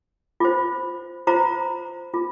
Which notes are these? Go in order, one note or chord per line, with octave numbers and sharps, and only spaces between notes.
F4 C5
F4 C5 A#5
F4